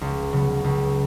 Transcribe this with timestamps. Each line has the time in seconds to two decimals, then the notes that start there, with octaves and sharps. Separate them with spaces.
0.01 C#2
0.33 C#3 F#3 B3
0.64 C#2